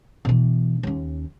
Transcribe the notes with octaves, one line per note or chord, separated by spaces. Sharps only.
B2 E3
D#2 C#4